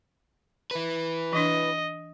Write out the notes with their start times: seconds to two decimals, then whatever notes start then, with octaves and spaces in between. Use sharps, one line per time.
0.71 E4 B4
1.33 E3 D4 D#5